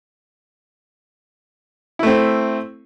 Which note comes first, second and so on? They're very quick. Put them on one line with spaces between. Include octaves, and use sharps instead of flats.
E4 A3 C4